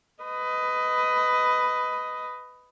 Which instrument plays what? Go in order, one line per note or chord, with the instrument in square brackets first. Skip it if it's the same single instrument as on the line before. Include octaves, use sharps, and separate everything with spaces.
[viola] B4 D#5